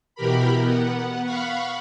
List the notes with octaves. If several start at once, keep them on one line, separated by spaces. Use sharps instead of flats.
B2 E3 G4 A#4 B5
B3 F#5
F5 F#5 B5 C#6